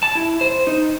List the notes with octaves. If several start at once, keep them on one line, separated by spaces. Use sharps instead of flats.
A5
E4
C5
D#4